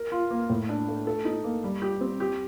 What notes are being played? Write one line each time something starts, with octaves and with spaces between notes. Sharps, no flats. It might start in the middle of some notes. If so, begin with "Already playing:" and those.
Already playing: A#4
F4
A#3
A2
D4
A3
A4
D#4
A#3
G3
G4
C4
G4